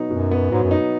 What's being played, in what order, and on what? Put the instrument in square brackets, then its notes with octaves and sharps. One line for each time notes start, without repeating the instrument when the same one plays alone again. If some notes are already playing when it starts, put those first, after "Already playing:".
Already playing: [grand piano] B2 F#3 B3 D#4
[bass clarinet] F#2 [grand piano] B2
[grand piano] B3
[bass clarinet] G#2 [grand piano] F#3
[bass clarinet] F#2
[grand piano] D#4